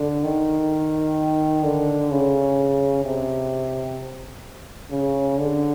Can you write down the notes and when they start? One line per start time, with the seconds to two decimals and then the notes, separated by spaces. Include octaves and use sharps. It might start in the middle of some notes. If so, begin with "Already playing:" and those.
Already playing: D3
0.24 D#3
1.63 D3
2.11 C#3
3.04 C3
4.90 C#3
5.38 D3